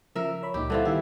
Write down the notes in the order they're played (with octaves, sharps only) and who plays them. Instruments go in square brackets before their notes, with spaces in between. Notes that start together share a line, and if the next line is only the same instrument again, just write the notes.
[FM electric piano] C#3 F3 [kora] A#4 E5
[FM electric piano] E6
C#5 B5
[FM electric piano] C#2 A#2 D#4 [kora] G4
[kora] D3 E3 F4 [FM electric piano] G3 C4
[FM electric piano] D#3 B3 G4 [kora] E4